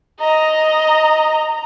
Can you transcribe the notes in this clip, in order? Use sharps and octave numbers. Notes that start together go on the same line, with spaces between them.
D#5 A#5